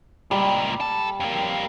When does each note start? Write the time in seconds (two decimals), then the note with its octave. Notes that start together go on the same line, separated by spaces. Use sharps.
0.31 C#2 A#2 G3
0.81 A4
1.20 F2 A#3